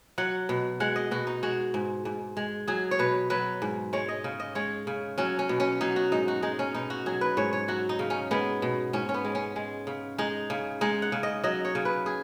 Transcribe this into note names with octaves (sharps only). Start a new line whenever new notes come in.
F#3 F#5
B2
G#3 F#5
D#5
B2 F#4
D#4
G#3 F#4
G#2
G#2
G#3
F#3 G#4
C#5
B2 B4
F#3 B4
G#2
G#3 C#5
D#5
C#3
D#5
G#3 C#5
C#3
F#3 C#4
C#4
B2
C#4
F#3 D#4
F#4
G#2 D#4
F#4
G#3 D#4
C#4
B2 D#4
F#4
F#3 G#4
B4
G#2 C#5
C#5
F#3 F#4
D#4
C#3
C#4
G#3 B3
B2
G#2 C#4
C#4
B3
G#3
C#4
G#3
C#3
G#3 D#4
C#3
G#3 D#4
F#5
C#3
D#5
F#3 D#5
C#5
C#3
B4
G#4